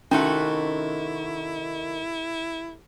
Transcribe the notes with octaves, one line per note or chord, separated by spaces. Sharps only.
C3 D#3 A3 C#4 E4 F#4